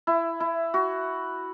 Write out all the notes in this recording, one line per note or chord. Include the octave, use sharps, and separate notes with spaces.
E4
E4
F#4